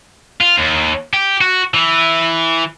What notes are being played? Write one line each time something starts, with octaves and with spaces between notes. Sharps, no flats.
F4
D#2
G4
F#4
E3